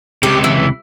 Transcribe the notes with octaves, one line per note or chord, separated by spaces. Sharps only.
C#2 C3 G4
E3